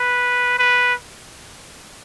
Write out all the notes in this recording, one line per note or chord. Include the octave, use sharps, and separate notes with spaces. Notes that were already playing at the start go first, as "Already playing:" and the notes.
Already playing: B4
B4